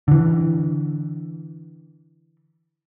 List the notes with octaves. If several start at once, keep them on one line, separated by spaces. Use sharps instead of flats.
D3 E3